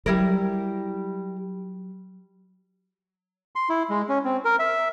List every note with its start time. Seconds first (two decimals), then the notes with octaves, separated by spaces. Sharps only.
0.06 F#3 G3 E4 A#4
3.55 C6
3.69 E4
3.90 G#3
4.09 C#4
4.25 C4
4.45 A#4
4.59 E5